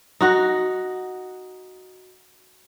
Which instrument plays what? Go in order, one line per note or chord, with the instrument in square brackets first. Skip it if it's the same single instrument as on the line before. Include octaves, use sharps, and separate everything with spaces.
[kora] D#4 F#4 F#5